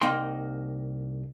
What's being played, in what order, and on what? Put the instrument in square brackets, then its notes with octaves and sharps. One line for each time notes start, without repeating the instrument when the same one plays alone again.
[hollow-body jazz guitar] C2 A#3 D#4 G5 C6